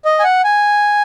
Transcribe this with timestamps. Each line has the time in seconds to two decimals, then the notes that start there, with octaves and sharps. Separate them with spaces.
0.05 D#5
0.20 G#5
0.24 F#5
0.44 G#5